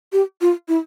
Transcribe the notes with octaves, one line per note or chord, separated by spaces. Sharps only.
G4
F4
E4